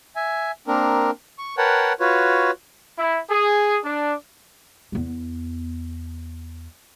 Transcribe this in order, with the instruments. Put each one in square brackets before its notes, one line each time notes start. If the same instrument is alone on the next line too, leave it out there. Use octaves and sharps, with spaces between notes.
[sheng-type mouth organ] E5 G#5
A#3 C4 D4 A#4
C#6
A#4 B4 C#5 F#5 G5 A5
F4 F#4 B4 C#5
[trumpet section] E4
G#4
D4
[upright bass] E2 B3